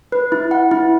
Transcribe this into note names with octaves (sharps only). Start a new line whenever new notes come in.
B4
E4
F#5
E4